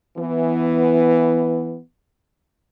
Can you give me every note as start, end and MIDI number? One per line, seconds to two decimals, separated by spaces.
0.18 1.78 52
0.18 1.78 59